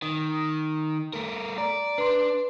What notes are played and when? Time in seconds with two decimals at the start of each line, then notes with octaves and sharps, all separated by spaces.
0.02 D#3
1.13 A3 A#4
1.58 D5 A#5
1.98 D4 B4 C6